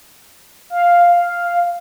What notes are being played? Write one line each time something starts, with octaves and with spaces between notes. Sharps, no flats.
F5